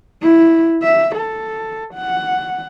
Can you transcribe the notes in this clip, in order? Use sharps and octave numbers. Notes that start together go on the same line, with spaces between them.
E4
E5
A4
F#5